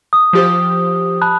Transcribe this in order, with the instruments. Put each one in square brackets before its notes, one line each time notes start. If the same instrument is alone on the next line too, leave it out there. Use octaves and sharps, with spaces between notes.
[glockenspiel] D#6
[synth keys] F3 G4 C5
[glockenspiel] A5 B5 F#6